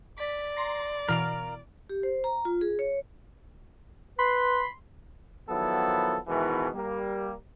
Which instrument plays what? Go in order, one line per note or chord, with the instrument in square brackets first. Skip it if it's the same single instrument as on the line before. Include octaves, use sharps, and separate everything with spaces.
[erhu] D5 [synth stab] B6
[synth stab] A#5 C6 A#6
[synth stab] B2 E3 D7 [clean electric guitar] A#4 F5 A#5
[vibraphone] G4
C5
A#5
F4
G#4
C#5
[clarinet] B4 [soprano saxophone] B5 [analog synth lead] C6
[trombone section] D#3 F3 F#3 B3 E4 A4
G#2 B2 D#3 E3
G3 A#3